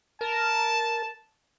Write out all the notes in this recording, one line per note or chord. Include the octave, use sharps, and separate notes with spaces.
A#4 A5